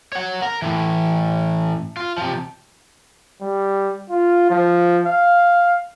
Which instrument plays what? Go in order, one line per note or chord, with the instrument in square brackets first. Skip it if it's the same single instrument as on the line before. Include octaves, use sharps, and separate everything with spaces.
[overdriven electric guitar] C#5 F#5
A#4
A2 E3
F4
C3 F3
[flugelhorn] G3
F4
F3
F5